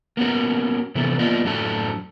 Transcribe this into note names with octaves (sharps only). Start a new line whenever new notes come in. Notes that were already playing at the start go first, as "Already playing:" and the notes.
A#3 B3 C#4 F#4
C3 E3 B3 A4
A#3 B3 F4 D5 D#5
F#2 A2 D4 F#4 A4 A5